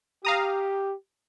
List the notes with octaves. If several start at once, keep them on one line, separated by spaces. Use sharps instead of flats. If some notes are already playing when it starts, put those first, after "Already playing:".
G4 F5 A#5 D#6